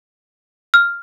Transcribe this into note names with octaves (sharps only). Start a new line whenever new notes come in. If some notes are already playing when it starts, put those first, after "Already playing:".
F6